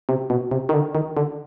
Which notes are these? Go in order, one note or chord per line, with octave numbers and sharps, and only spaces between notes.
C3
B2
C3
D#3
D3
D#3
D3